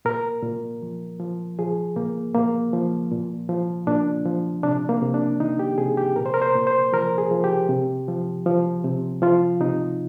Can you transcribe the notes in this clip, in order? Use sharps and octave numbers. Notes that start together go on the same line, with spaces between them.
A#2 A#4
A#2
F3
F3
F3 G#4
A#2 A#3
A#2 A#3
F3
A#2
F3
A#2 D4
F3
C3 D4
A#3
C3
D4
D#3 D#4
G4
C3 G#4
G4
A#2 A#4
C5
A#4
C5
A#2
C5
F3 A#4
G#4
F3
G4
C3
F3
F3
C3
F3 F4
C3 D#4